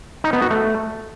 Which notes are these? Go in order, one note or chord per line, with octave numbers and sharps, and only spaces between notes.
D#4
B3
F#4
A3